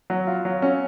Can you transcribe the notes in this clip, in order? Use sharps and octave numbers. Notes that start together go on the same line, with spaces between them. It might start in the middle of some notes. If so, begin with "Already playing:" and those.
F#3
F4
F#3
C#4